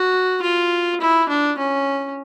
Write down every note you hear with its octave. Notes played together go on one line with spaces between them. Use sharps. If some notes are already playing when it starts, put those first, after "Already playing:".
Already playing: F#4
F4
E4
D4
C#4